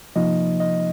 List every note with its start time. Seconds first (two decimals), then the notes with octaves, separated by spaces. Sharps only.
0.16 C3 F3 A#3 D#4 D#5
0.60 D#5